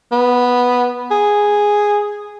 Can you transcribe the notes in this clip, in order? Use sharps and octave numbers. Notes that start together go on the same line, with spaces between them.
B3
G#4